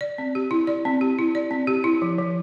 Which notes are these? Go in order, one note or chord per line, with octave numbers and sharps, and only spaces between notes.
D5
C4
G4
E4
D5
C4
G4
E4
D5
C4
G4
E4
F3
F3